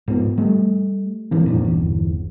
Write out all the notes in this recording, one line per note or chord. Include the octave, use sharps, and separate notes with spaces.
G#2 B3
G3 A3
G#2 E3 A#3
F2 A#2 D4
G1 E2